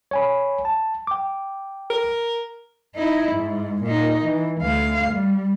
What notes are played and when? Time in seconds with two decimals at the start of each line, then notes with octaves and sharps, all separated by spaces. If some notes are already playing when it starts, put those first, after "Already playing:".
0.11 C#5 G#5 B5
0.65 A5
1.07 G5 D6
1.90 A#4
2.95 D#4 E4
3.32 G#2
3.84 A#2 D#4
4.24 E3
4.62 D2 F5
5.12 G3